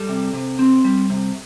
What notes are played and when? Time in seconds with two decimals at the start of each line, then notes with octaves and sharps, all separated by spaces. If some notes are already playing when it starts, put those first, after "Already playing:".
Already playing: G3 A4
0.09 C3
0.33 C3
0.59 C4
0.84 G3
1.10 C3